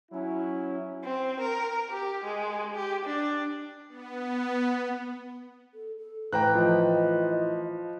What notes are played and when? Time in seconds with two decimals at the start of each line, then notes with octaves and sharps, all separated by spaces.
0.12 F#3 C#4 E4
1.04 C4
1.40 A#4
1.90 G4
2.24 G#3
2.75 G4
3.05 D4
3.89 B3
5.74 A4
5.98 A4
6.33 A2 E3 G5 A#5 F#6
6.55 F3 D#5